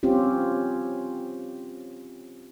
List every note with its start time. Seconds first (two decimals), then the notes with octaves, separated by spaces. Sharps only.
0.03 C4 C#4 F4 G4